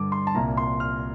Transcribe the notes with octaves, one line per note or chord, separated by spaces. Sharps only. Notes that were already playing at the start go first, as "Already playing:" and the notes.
Already playing: G2 D3 D6
C6
A5
C2 A#2 A#5
C6
F6